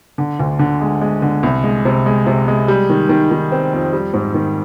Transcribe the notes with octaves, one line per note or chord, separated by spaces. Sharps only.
D3
D2
D3
G#3
G#3
D3
C2
G#3
C3
G#3
C3
G#3
G3
D#3
D#3
D#3
C4
F2
G3
G#2
D#3